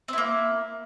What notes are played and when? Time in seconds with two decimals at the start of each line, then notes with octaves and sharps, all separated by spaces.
0.08 C4
0.13 E4
0.18 A#3